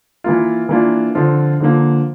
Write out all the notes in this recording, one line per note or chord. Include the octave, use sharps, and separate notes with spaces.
E3 A#3 F4
E3 A#3 D4 F4
D3 F3 C4 F4
D3 F3 A#3